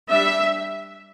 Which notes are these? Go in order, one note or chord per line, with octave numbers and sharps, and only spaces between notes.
G3 D4 E5